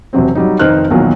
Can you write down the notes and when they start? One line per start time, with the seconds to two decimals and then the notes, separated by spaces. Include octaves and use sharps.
0.13 E1 C3 F#3 C4
0.35 F#3 G3 D#4
0.59 F1 D#3 D#4 C5 F6 F#6
0.90 B1 E2 A#2 D#3 F#3